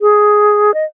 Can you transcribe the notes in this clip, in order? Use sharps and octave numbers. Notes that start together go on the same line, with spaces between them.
G#4
D#5